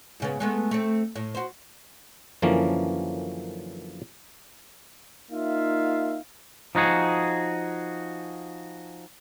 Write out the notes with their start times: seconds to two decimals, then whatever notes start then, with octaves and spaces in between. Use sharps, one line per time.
0.20 G#2 C#3 B3
0.40 G#3 A3 B3
0.71 A3 C4
1.16 A2
1.35 F#4 C5
2.42 F#2 D3 E3 F3 A#3 C#4
5.30 A#3 D#4 F4 E5 F5
6.75 F3 D#4 F#4 G#4